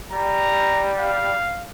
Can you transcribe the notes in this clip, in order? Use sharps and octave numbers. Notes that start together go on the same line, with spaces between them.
G3 A#5
F5